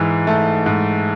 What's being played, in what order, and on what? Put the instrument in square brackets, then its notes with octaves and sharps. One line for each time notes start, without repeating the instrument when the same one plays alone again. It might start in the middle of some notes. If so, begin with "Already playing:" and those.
Already playing: [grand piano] G#2 E3
A3
G#2